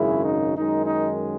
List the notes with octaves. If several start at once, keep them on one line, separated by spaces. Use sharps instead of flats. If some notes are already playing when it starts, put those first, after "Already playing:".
Already playing: G#1 F#2 C#3 G#3 E4
D#4
F#2 D#3 G#3 D#4
D#4